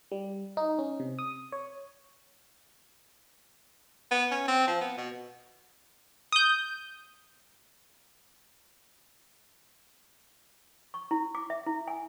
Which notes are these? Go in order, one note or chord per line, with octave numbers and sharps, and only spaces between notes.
G3
D#4
C#4
C3
D#6
C#5
B3
C#4
C4
F3
B3
B2
D#6 G6
C#6
E4
D6
E5
E4
G#5